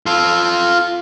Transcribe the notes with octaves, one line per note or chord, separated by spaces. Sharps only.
F4 A4